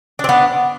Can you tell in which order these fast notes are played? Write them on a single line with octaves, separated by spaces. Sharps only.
D4 C4 B3